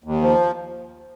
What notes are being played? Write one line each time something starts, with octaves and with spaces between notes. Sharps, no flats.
D#2
F3